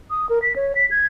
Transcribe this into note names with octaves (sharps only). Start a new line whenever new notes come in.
D#6
A#4
B6
C#5
B6
G#6